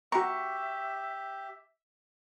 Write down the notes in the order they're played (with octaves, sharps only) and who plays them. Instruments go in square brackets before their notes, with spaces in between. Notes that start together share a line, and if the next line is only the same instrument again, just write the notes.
[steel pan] F#4 A#5 [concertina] G4 [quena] E5 [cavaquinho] C#6